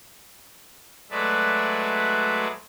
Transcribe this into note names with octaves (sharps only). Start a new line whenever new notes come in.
F#3 G#3 A3 B4 D5 E5